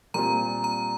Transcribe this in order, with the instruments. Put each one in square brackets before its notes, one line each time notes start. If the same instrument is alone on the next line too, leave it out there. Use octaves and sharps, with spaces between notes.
[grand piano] A#2 G3 C4 F4 [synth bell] A#5
[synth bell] A#5